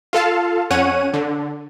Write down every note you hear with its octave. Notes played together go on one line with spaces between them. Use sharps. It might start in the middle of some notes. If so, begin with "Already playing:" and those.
F4 A4 F5 A5
F2 C#4 C#5 F#5 D#7
D3